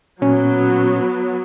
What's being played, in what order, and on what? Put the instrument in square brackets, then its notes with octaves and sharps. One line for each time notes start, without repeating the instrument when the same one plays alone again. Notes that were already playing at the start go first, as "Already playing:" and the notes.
[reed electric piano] A#2 C#4 [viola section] F#3 B3